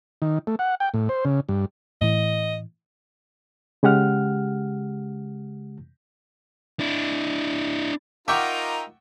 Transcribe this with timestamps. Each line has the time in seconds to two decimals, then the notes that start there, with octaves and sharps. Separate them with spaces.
0.22 D#3
0.47 A3
0.59 F#5
0.80 G5
0.94 A2
1.09 C5
1.25 C#3
1.49 G2
2.02 A2 E3 D#5
3.83 C#3 G#3 G4 F#5 F6
6.80 D4 E4
8.28 D#4 F4 A#4 E5 F#5 G5 C#6 D6